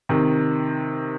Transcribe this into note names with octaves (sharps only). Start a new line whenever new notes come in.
C3 D#3